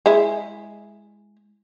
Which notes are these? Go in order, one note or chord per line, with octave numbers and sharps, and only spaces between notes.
G#3 E4